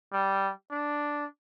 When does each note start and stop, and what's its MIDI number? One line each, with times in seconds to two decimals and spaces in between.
0.13 0.51 55
0.71 1.25 62